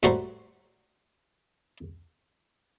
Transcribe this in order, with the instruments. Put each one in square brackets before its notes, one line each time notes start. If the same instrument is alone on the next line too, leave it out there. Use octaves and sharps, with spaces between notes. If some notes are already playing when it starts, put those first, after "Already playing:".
[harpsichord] A2 G3 F#4 A4 C5 A#5